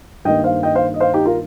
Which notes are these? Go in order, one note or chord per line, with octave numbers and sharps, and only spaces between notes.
G2 D#3 A#3 D#5 G5
C5 F5
D#5 G5
C5 F5
D#5
C5 F5
D#4 G4
F4 A#4